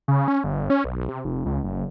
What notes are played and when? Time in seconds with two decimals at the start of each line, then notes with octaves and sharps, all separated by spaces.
0.08 C#3
0.28 C#4
0.44 G1
0.70 C#4
0.84 B1
1.08 C3
1.25 F1
1.46 C#2
1.64 F#1